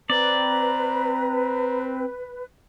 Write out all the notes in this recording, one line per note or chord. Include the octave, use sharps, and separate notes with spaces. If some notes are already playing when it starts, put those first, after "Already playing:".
C4 B4 D5 A#5